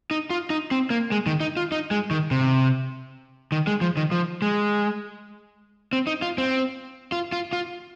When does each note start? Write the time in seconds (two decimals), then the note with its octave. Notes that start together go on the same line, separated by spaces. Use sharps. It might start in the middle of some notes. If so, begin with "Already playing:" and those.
0.11 D#4
0.30 F4
0.50 D#4
0.71 C4
0.90 A#3
1.12 G#3
1.26 D#3
1.40 D#4
1.57 F4
1.72 D#4
1.91 G#3
2.11 D#3
2.31 C3
3.52 D#3
3.67 G#3
3.81 F3
3.97 D#3
4.11 F3
4.42 G#3
5.93 C4
6.07 D#4
6.22 F4
6.38 C4
7.12 F4
7.32 F4
7.53 F4